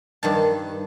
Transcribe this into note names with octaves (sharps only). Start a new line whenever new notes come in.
G2 D#3 A5